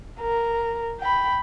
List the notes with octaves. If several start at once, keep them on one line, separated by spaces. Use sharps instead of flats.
A#4
G5 B5